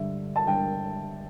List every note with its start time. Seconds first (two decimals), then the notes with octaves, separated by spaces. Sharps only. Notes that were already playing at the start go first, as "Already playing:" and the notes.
Already playing: G2 D3 E5
0.36 A5
0.47 G2 D3 G5